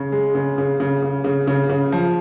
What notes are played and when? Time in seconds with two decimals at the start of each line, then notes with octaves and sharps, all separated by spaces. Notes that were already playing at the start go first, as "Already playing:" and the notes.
Already playing: C#3
0.12 G#3
0.35 C#3
0.58 C#3
0.80 C#3
1.02 C#3
1.24 C#3
1.47 C#3
1.69 C#3
1.92 F3